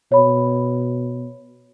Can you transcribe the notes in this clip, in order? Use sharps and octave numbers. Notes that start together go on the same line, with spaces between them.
B2 C#5 B5